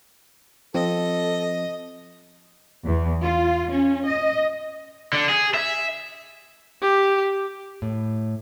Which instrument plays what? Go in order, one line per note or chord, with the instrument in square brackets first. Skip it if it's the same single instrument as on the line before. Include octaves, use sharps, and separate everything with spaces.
[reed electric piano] F3 C4 [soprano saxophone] A4 [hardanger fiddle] D#5
[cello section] E2
F4
C#4
D#5
[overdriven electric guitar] D3
G#4
E5
[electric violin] G4
[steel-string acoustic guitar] A2